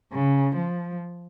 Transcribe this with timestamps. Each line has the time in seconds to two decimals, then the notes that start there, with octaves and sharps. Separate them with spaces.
0.13 C#3
0.56 F3